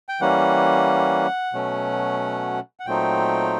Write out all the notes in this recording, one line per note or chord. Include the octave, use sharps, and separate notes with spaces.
G5
E3 G3 A#3 C#4 F#5
B2 F#3 A3 C#4
F#5
A#2 F#3 A3 C4 D#4 G5